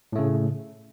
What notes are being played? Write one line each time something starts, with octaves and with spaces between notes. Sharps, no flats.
A2 C#3 A3